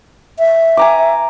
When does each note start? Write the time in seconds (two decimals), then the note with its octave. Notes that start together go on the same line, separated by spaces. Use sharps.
0.39 E5
0.77 G#5 A#5 D6